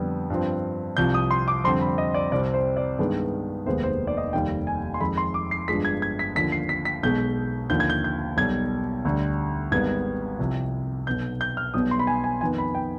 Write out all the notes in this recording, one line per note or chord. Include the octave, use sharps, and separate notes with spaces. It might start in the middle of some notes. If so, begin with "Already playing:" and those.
Already playing: F2 D3 G3 B3
G2 F3 C4
C2 C3 F3 G6
D#6
C6
D6
F2 D3 G3 C4 C6
B5
D#5
D5
C2 C3 G3 C4 D5
C5
D5
G2 D#3 G#3 B3
F1 D#2 D#3 G#3 B3 C5
C5
D5
D#5
F1 D#2 D#3 G3 G5
G#5
C6
F2 D#3 G#3 B5
C6
D6
C7
G1 G2 F3 G#3 B6
G#6
G#6
B6
D#2 D3 F3 B6
C7
B6
B6
B1 B2 G#3 G6
D#2 D3 F3 G6
G#6
G6
G6
B1 B2 G3 G#6
D2 D3 G3
G#1 G#2 G3 B3 G#6
C2 C3 F3
B1 B2 B3 G6
G6
F6
B1 B2 G3 B3 D#6
C6
B5
G#5
G#5
F2 D#3 B3 G#5
B5
G5